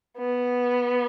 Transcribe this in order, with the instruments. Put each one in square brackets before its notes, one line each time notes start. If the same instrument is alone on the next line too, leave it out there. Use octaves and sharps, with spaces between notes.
[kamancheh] B3